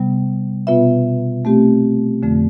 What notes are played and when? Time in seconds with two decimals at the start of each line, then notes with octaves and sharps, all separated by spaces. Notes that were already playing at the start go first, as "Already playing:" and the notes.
Already playing: C3 G3 B3
0.67 B2 B3 F4 B4 E5
1.45 A3 C4 G4
2.23 F2 D3 F3 A3